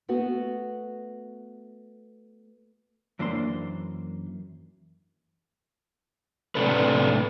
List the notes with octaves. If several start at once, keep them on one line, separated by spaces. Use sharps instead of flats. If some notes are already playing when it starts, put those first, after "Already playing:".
A3 B3 F#4
F#2 E3 A#3 D4 C5 C6
A2 C3 D4 A4 B4